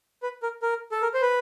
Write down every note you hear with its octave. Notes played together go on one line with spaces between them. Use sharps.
B4
A#4
A#4
A4
A#4
C5
B4